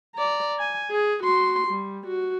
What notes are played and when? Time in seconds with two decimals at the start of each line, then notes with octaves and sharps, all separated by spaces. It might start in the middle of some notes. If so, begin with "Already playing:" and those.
0.16 D5 A#5
0.59 G#5
0.91 G#4
1.23 F#4 C6
1.68 G3
2.07 F#4